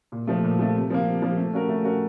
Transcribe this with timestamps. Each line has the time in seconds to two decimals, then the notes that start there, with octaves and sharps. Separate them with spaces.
0.12 A#2
0.27 F3 A3
0.44 A#2
0.59 F3 A3
0.75 C3
0.90 F3 A#3
1.06 C3
1.22 F3 A#3
1.37 A3
1.53 C#4 F#4 A#4
1.69 A3
1.85 C#4 F#4 A#4